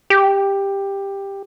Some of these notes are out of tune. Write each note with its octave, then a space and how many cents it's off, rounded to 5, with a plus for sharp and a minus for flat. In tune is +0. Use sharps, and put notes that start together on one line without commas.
G4 +10